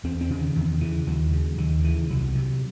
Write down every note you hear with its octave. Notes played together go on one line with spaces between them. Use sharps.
E2 C4
C4
C#3
D#3
E2 D#3
C#3 E3
D#2 F#3
C#3
D#2 D#3
C#3 E3
C2 F#3
C3